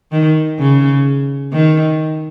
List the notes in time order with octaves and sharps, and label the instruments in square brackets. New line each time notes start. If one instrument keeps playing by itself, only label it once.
[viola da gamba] D#3
C#3
D#3